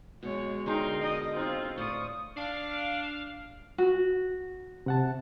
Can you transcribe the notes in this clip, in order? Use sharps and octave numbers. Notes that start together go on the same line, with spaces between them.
B2 G#3 C#5
D3 G#3 D4 D#4 G#4 A#4 G5 C6
B2 D#5
C4 D#4 F4
A2 C5 D5 C#6 D#6
D4 F5
F#4
C3 F#5 A5